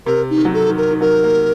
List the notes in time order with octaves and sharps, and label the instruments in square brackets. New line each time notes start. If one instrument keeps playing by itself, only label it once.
[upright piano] C3 [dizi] A#4
[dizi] D#4
[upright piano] D#3
F#3
[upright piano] D#3 [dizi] A4
[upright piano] D#3
[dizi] A#4
[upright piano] D#3
[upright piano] F#3 [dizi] A#4
[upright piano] A#3